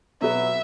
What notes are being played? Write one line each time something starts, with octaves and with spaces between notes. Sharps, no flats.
B2 F#3 B3 F#4 B4 E5